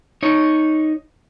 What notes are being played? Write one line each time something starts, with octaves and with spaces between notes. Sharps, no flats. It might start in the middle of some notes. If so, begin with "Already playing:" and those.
D#4 C#5